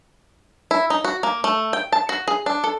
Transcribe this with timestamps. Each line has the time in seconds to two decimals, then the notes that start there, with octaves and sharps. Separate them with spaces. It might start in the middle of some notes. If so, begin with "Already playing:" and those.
0.71 E4
0.90 D#4
1.04 F#4
1.23 A#3
1.44 A3
1.73 G5
1.92 A5
2.09 F#4
2.28 G#4
2.46 D4
2.64 A4